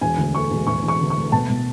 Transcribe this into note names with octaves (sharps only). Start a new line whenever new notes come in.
E1 G#5
D2
A3 C#6
E1
E1 C#6
E1 C#6
D2
C#6
A3
B2 A5
B2